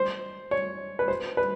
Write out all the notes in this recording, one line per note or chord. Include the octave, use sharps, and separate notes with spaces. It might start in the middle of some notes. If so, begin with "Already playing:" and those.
Already playing: C5
C#5
B4
C5
B4